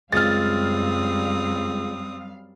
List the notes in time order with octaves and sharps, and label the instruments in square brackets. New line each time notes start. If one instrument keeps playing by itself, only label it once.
[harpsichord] C#2 [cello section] F#2 G3 F5 [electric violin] C4 D#6 [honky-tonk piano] F6 A6